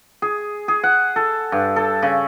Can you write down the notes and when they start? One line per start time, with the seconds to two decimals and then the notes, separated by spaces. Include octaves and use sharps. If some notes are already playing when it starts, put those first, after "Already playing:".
0.22 G#4
0.68 G#4
0.83 F#5
1.16 A4
1.52 G2
1.76 A4
2.02 C#3